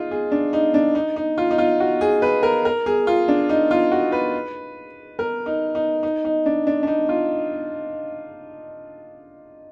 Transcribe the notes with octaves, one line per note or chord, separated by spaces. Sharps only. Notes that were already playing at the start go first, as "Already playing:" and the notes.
Already playing: D#4 F4 G#4
G#4
D4
D#4
D4
D#4
D#4
F4
D#4
F4
F#4
G#4
B4
A#4
A#4
G#4
F4
D4
D#4
F4
F#4
B4
A#4
D#4
D#4
D#4
D#4
D4
D4
D4
D#4
F4